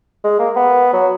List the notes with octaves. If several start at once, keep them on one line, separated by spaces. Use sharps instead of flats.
G#3
A#3
B3
F#3